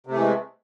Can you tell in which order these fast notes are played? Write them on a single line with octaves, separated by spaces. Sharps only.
C3 A3 E3 G#3